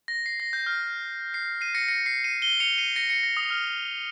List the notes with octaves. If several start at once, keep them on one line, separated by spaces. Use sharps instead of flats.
A#6
C7
A#6
G6
F6
C7
C7 D#7
A#6 C#7
A#6 C#7
C7
C7 D#7
D#7 G7
C#7 F7
C7 D#7
A#6 C#7
A#6 C#7
A#6
D#6
F6